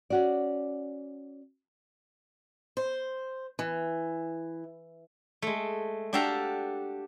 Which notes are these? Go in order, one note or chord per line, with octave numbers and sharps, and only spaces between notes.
C#4 F#4 D5
C5
E3
G#3 A3
D4 F#4 G4 A4 F5 A#5